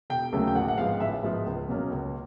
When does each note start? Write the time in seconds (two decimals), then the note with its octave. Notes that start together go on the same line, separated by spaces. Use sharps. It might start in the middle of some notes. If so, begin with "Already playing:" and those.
0.10 E1 G5
0.33 D#2 C#3 F#3 A3
0.48 G5
0.55 A1 F#5
0.68 F#5
0.78 G#2 F3 G#3 B3 F5
1.00 A1 E5
1.23 G#2 F3 G#3 B3
1.46 C#2
1.69 B2 F#3 A#3 C#4
1.91 C#2